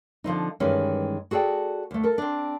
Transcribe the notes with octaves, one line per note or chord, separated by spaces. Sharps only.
D3 F3 C4 D#4
G2 D#3 E3 G3 G#3 C#4
F#4 G#4 A4 D5 G5
D2 A3
A4 A#4
C4 D4